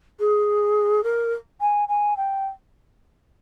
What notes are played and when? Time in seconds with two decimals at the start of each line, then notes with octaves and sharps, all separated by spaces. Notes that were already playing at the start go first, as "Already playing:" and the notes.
0.19 G#4
1.03 A#4
1.60 G#5
1.88 G#5
2.17 G5